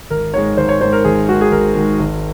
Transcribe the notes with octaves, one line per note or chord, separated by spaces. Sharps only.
G#1 A#4
G#2 D#3 G#3 C#5
G#1 C5
C#5
G#2 D#3 G#3 C5
A#4
G#1 G#4
G#2 D#3 G#3 F#4
G#4
G#1 A#4
G#2 D#3 G#3
G#1